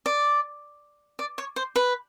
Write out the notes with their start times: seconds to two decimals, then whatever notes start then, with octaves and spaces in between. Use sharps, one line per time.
0.06 D5
1.19 D5
1.38 C#5
1.56 C5
1.76 B4